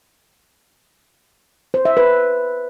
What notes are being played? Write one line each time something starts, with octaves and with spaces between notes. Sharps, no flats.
C5
E5
B4